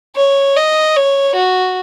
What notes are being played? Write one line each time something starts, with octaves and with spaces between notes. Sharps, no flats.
C#5
D#5
C#5
F#4